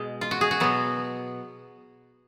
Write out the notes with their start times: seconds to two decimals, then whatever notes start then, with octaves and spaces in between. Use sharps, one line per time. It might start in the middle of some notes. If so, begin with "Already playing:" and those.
Already playing: B2 G#3
0.21 F4
0.31 F#4
0.41 G#4
0.51 F#4
0.60 B2 F#3 B3